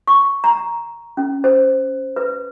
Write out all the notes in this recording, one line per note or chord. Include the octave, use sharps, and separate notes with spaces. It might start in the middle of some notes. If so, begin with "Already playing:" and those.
C#6
A#5
C#4
C5
B4